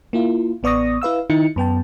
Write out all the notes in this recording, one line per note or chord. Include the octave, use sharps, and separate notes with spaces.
A#3 E4 F4
A1 B3 D5 C#6 D#6 A#6
E4 B4 F5 E6
D#3 D#4 E4 C#7
F#2 B3 G5 A5